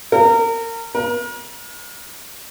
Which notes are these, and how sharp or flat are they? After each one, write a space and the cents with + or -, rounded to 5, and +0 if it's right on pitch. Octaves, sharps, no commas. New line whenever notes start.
A#4 -25
A#4 +40